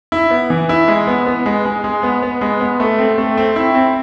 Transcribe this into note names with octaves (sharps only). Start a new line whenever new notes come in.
E4
B3
E3
E4
G#3
B3
B3
G#3
G#3
G#3
B3
B3
G#3
B3
A3
C4
A3
C4
E4
C4